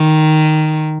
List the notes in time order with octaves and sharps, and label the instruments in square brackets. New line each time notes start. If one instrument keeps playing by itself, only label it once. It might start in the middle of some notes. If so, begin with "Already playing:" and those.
Already playing: [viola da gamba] D#3